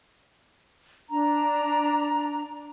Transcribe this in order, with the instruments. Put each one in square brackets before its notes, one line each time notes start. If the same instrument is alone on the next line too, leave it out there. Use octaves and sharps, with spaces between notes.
[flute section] D4 A#5